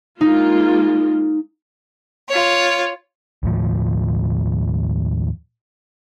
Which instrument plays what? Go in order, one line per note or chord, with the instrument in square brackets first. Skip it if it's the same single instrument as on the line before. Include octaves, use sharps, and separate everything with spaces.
[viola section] G#3 A#3 F4 [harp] D#4
[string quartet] F4 C#5
[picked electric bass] D#2 A2 F3